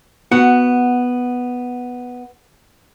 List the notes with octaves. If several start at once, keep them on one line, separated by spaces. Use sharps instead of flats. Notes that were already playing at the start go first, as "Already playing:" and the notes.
B3 F#4 F#5